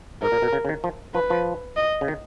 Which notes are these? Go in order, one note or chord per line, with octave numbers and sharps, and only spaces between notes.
G#2 A#4
A#2
B2
C#3
C#3
D#3
F3
F3 B4
F3
D#5
C#3
D#3